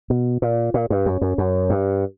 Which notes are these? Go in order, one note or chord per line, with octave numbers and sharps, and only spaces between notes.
B2
A#2
A#2
G2
F#2
F#2
F#2
G2